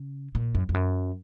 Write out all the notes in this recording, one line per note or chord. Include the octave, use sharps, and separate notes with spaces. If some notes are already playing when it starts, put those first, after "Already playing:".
Already playing: C#3
A#2
F#2
F2
F#2